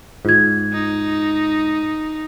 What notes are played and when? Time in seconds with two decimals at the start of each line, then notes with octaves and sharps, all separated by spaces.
0.25 G#2 F4 G#6
0.73 D#4